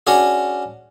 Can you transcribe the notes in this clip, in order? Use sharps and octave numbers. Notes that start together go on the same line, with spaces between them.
C#4 D4 F#4 G#4